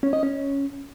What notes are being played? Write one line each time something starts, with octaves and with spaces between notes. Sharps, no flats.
C#4
D#5
C#4